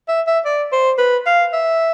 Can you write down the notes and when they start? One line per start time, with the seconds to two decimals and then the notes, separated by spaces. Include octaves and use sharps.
0.08 E5
0.27 E5
0.45 D5
0.72 C5
0.98 B4
1.26 F5
1.53 E5